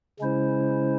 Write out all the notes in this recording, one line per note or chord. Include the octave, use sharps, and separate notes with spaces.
C#3 G#3 C#4 E4 C5